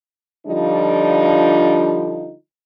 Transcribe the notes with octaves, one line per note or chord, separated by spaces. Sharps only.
D3 F3 G3 D4 D#4 F4